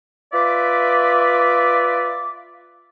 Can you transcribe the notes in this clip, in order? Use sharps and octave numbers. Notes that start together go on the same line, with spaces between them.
F4 B4 D5 E5 D6